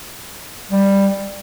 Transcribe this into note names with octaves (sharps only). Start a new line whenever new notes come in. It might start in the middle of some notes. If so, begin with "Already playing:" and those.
G3